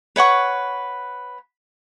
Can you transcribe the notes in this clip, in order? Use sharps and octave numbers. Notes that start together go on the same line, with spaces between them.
B4 C#5 F#5 C#6